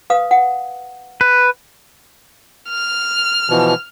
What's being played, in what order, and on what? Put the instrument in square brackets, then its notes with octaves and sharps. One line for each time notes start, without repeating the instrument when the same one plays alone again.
[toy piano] B4 F5 D#6
F#5
[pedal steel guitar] B4
[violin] F6
[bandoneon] B2 E3 F3